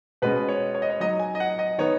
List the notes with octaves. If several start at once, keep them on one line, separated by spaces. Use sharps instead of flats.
B2 G#3 C#4 B4
C#5
C#5
D#5
C#5
F#3 D#4 D#5
G#5
D#5
F#5
D#5
D#3 B3 D#4 C#5